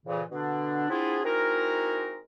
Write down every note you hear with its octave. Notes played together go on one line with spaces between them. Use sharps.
F2 A#2 C#3 E3
B2 D3 D4
B3 C4 D4 E4 F4 G#4
G#3 C4 D#4 E4 F#4 A#4